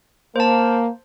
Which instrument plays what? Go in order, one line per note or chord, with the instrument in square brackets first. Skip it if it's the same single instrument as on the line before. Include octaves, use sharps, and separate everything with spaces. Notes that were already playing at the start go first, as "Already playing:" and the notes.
[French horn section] A#3 [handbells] C5 A5